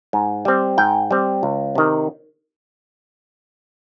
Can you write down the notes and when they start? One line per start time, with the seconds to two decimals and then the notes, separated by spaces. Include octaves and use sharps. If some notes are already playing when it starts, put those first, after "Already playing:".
0.13 G#2
0.45 G3 C4
0.78 G#2 G5
1.11 G3 C4
1.43 C#2
1.75 C3 D#3